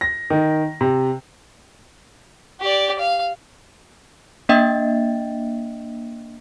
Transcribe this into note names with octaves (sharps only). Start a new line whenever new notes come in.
A#6
D#3
C3
G4 D5
F5
A#3 D4 D#5 E5 G5 A6